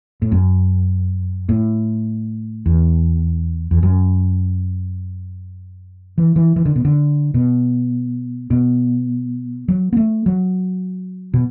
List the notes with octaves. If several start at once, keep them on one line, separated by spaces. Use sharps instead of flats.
A2
F#2
A2
E2
E2
F#2
E3
E3
E3
D3
B2
D3
B2
B2
F#3
B3
A3
F#3
B2